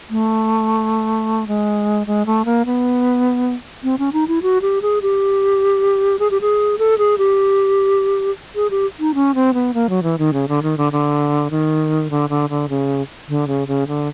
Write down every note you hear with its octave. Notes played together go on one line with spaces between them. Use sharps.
A3
G#3
G#3
A3
A#3
B3
C4
C#4
D#4
E4
F#4
G4
G#4
G4
G#4
G4
G#4
A4
G#4
G4
G#4
G4
D#4
C#4
C4
B3
A#3
F#3
E3
D#3
C#3
D3
D#3
D3
D3
D#3
D3
D3
D3
C#3
D3
C#3
C#3
D3